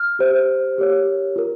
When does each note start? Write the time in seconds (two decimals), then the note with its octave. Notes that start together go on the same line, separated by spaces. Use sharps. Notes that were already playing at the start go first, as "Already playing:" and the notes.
Already playing: F6
0.19 G4 C5
0.78 G4 A#4 C#5
1.36 F4 A#4